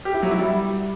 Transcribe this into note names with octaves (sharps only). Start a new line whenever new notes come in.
G4
E4
F#3
E4
G3